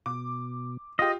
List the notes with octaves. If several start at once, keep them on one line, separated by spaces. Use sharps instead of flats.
B2 D6
F4 G4 D#5